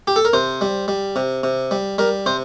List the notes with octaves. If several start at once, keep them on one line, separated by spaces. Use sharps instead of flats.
G4
A4
A#4
C3 C5
G3
G3
C3
C3
G3
G3 A#4
C3 C5